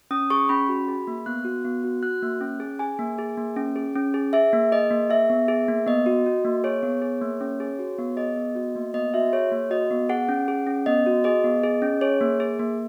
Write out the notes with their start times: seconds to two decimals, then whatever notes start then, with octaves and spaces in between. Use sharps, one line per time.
0.11 C#4 D#6
0.30 G#4 C#6
0.49 C#4 B5
0.69 F#4
0.88 G#4
1.07 A#3
1.26 B3 F#6
1.45 F#4
1.64 B3
1.84 F#4
2.02 F#4 F#6
2.22 A#3
2.41 C#4
2.60 G#4
2.79 G#4 G#5
2.99 A#3
3.18 G#4
3.37 A#3
3.56 C#4
3.76 G#4
3.96 C#4
4.14 G#4
4.33 G#4 E5
4.53 A#3
4.72 G#4 D#5
4.91 A#3
5.10 G#4 E5
5.30 B3
5.48 G#4
5.68 A#3
5.86 B3 D#5
6.06 F#4
6.26 F#4
6.45 A#3
6.64 G#4 C#5
6.83 B3
7.02 G#4
7.22 A#3
7.40 C#4
7.60 G#4
7.79 F#4
7.99 B3
8.17 G#4 D#5
8.36 B3
8.55 F#4
8.75 A#3
8.94 B3 D#5
9.14 F#4 E5
9.33 G#4 C#5
9.52 A#3
9.71 F#4 D#5
9.91 B3
10.09 G#4 F#5
10.28 C#4
10.48 G#4
10.67 C#4
10.86 B3 D#5
11.06 F#4
11.24 G#4 D#5
11.44 B3
11.63 G#4
11.82 C#4
12.01 G#4 C#5
12.21 A#3
12.40 G#4
12.59 A#3